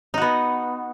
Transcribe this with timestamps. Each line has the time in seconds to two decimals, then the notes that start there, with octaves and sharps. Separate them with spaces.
0.14 D#4
0.18 F#4
0.22 B3